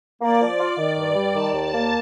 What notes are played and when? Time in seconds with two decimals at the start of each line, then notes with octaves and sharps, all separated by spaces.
0.21 A#3 D5
0.41 F3
0.59 F4
0.78 D#3
0.97 G2
1.15 G3
1.34 D#3 A5
1.53 D#2
1.62 A5
1.72 A#3